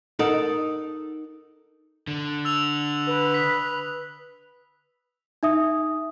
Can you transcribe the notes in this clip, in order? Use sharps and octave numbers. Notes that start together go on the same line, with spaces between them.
D#4 A4 A#4 F#5
D3
E6 F7
B4
D#6 B6
D#4 E5 D#6